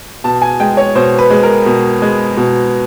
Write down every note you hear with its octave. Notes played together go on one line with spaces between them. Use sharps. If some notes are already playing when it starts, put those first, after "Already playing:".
B2 A5
G#5
G#3 G5
C#5
B2 C5
B4
G#3
A#4
B2
G#3
B2